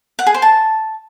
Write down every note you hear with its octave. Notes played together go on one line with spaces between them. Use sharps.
F#5
G#4
C5
A5